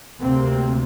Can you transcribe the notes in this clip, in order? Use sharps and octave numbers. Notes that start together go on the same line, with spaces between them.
D2 C3 A#3 C4